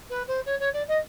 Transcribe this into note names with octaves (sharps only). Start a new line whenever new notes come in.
B4
C5
C#5
C#5
D5
D#5